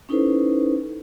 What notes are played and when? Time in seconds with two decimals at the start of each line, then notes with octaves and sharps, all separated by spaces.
0.09 C#4 D#4 E4 A4 B4 C5